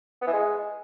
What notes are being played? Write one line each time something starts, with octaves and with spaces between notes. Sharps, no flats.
B3
E3
G#3